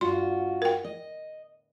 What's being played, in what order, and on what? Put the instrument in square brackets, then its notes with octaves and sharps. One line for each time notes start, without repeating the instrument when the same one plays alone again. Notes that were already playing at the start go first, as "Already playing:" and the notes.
[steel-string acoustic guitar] G2 F4 F#4 [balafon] C6
[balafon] A#4 G5
[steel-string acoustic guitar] D#5